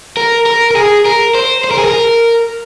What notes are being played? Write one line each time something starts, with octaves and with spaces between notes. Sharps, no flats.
A#4
A#4
A#4
G#4
A#4
C5
C5
A#4
G#4
A#4